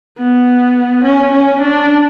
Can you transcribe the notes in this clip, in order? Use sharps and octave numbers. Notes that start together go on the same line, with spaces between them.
B3
C#4
C#4
D4